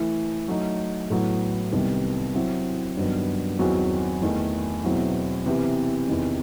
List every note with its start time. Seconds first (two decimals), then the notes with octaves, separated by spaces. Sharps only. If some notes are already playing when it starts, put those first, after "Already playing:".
Already playing: E3 A3 E4
0.48 F#3 A3 D#4
1.10 A2 F#3 B3
1.72 C2 C3 D#3 G3 B3
2.34 F#3 C4 E4
2.97 G2 D#3 F#3 B3
3.59 E2 D#3 F#3 C4 F#4
4.21 E2 D#3 A3
4.83 E2 B2 F#3 C4 E4
5.46 C3 E3 B3 E4 G4
6.08 E2 C3 D#3